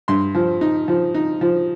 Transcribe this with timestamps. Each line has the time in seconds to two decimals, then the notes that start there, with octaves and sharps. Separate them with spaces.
0.08 G2 C6
0.35 F3
0.61 D#4
0.88 F3
1.14 D#4
1.41 F3